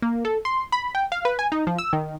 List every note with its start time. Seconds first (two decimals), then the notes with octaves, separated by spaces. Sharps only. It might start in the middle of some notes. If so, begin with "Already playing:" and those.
0.02 A#3
0.25 A4
0.45 C6
0.72 B5
0.95 G5
1.12 F5
1.25 B4
1.39 G#5
1.52 D#4
1.67 F3
1.78 E6
1.93 D#3